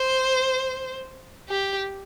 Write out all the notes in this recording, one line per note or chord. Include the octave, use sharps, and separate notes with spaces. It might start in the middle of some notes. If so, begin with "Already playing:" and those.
Already playing: C5
G4